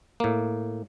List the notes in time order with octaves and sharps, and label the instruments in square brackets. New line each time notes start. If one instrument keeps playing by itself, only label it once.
[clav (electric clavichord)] A2 A#3